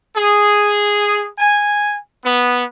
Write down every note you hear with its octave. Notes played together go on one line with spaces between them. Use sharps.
G#4
G#5
B3